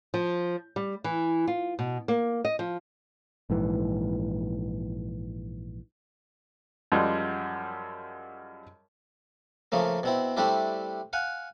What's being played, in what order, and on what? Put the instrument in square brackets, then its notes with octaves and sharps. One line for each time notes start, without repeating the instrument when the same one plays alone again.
[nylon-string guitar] F3
G3
E3
F4
B2
A#3
D#5
F3
[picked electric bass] A#1 G#2 E3
[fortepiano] F#2 F3 G3 G#3
[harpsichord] C#3 F3 A3 A#3
B2 C4 E4
G3 A3 C4 D4 E4 G4
F5 F#5 G#5